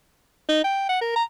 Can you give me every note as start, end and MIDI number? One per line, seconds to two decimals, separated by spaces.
0.49 0.64 63
0.64 0.85 79
0.89 0.99 78
1.02 1.11 70
1.16 1.24 82